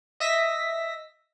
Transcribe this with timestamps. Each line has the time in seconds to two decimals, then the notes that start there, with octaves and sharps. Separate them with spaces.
0.20 D#5 E5 A#6 B6